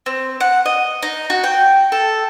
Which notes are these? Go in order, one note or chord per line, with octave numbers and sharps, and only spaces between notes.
C4
F#5
D#5
D#4
F#4
G5
A4